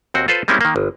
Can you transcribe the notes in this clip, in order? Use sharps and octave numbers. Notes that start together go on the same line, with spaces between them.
D#2 C4 F#4
F4 A4 B4 C5
G3 G#3 A#3 C4 C#4 E4
D#3 A#3
G1